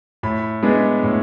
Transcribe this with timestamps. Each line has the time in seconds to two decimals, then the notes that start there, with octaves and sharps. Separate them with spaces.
0.23 A2 B5
0.63 G#3 B3 D4
1.03 A2